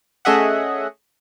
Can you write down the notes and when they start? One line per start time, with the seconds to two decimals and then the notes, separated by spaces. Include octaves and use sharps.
0.25 A3 C#4 G#4 D#5 E5 F#5